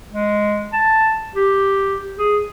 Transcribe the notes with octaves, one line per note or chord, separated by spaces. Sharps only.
G#3
A5
G4
G#4